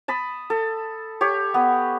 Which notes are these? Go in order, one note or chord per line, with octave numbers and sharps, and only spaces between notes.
A5 B5 D#6
A4
G4 C#5
B3